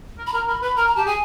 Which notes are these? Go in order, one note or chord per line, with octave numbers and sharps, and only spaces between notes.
A#4
B5
A#4 A#5
A#4 B5
B4 B5
A#4 A#5
A#5
G4 A5
G#4 G#5